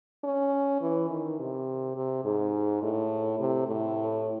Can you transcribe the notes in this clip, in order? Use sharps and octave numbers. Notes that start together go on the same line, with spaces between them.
C#4
E3
D#3
C3
C3
G#2
A2
C3
A2